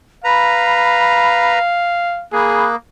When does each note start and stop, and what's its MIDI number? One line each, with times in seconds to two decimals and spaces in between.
0.24 1.59 71
0.24 2.25 77
0.24 1.59 82
0.24 1.57 83
2.33 2.76 58
2.33 2.69 68
2.33 2.73 83
2.33 2.73 87
2.33 2.73 90